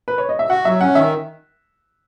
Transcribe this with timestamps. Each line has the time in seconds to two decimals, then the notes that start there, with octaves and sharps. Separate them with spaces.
0.08 B4
0.18 C#5
0.29 D#5
0.39 E5
0.50 F#4 F#5
0.65 F#3 E5
0.81 C#4 F#5
0.95 D#3 E5